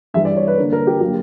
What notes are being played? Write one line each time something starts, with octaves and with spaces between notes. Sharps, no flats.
G2 E3 G3 E5
D5
C#5
B4
G2 D3 A#3 A#4
A#4
G4
D3 F#3 A#3 G4